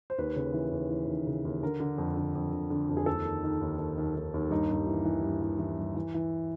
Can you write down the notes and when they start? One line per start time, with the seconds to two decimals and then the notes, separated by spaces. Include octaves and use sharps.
0.10 C5
0.18 D#2 B4
0.36 C#3
0.54 E3
0.72 D#2
0.90 E3
1.08 D#2
1.27 C#3
1.45 D#2
1.63 D3 A#4
1.80 D3
1.98 F2
2.17 D3
2.35 F2
2.53 D3
2.70 D3
2.89 F2
2.97 G#4
3.06 D#2 A4
3.25 D#3
3.44 D#3
3.61 D#2
3.78 D#3
3.98 D#2
4.16 D#2
4.34 D#2
4.51 G2 D#4
4.70 G2
4.87 E3
5.05 E3
5.23 G2
5.42 E3
5.59 E3
5.78 G2
5.96 E3
6.14 E3